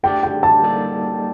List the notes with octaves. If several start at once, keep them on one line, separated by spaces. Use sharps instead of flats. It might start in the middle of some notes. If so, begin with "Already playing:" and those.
A3 D4 G4 D5 G5
G5
A5
G3 A#3 D#4 A4 D5